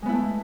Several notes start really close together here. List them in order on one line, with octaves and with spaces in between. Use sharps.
G#3 B3 E4 A3